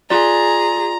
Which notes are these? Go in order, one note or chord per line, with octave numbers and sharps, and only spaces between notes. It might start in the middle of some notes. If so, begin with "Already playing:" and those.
F4 G#4 D5 A#5